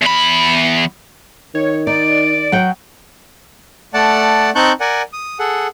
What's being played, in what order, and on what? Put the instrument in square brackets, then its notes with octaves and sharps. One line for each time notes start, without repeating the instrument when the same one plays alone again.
[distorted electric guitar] E2 B5
[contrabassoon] D#3 [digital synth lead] C#5
[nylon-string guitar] D#4 [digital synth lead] D5 [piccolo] D7
[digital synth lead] F#3 [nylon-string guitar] F#5 G5
[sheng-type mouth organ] A3 D5 F#5 A5
C4 D#4 A5 C#6 F#6 G6
A#4 D5 F#5 G#5
D#6
G#4 A4 F#5